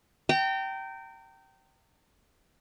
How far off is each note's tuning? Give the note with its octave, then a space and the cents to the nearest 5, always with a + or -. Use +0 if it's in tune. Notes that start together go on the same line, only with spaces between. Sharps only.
G5 -20 A#5 -35